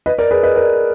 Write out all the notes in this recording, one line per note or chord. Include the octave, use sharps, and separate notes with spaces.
B4 D#5
A#4 D5
G#4 B4
B4 D#5
A#4 D5